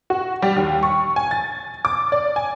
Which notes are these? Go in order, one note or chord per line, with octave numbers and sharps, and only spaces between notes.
F#4
G3
D#2
C#6
G#5
A6
D6
D5
G#5